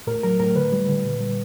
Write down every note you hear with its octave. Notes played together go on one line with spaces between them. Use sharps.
A2 A#4
F#3 A#4
A2 A#4
D3 B4
G3
D3
A#2
G3